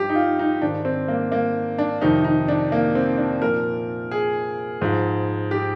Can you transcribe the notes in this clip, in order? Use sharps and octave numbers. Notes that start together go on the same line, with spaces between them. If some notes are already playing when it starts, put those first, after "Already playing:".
Already playing: G2 F3 G4
D#4
F4
D#4
G#2 D#3 D4
C4
A#3
A#3
D4
F2 C3 D#3 D#4
D#4
D4
A#3
C4
D4
A#2 F3 A#4
G#4
G#2 F3
G4